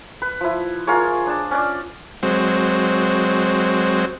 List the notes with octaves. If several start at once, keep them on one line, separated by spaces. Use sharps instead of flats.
B4
F3 E4
F4 G#4 A#4 C#5
D4 A5
C#4 D4 D5
F#3 G#3 C4